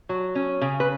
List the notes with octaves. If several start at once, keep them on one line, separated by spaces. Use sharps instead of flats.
F#3
C#4
C#3
B4